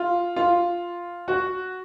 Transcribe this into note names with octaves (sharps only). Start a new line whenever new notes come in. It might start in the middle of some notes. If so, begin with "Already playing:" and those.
Already playing: F4
F4
F#4